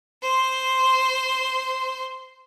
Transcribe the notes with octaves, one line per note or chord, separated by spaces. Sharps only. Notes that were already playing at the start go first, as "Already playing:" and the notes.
C5 C6